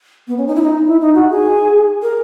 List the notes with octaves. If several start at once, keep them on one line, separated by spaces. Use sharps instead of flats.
B3
C#4
D#4
E4
D#4
E4
D#4
F#4
G#4
A#4